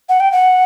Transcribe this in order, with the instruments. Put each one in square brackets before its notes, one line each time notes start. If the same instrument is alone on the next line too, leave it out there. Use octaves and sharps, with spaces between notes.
[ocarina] F#5
G5
F#5